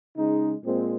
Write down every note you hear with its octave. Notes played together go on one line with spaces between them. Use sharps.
C#3 G#3 D#4
A#2 G#3 C4